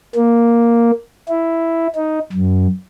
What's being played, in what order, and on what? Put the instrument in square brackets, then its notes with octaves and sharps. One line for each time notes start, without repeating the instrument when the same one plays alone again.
[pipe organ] A#3
E4
D#4
F#2